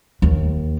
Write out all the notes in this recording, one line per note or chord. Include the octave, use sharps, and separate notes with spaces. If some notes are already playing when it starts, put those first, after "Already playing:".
D#2